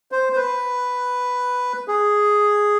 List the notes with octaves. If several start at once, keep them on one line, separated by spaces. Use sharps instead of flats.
C5
C5
B4
G#4